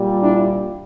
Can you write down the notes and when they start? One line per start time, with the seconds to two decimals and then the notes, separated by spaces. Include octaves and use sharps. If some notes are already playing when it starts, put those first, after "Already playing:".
Already playing: A#2 G3
0.22 D4 E4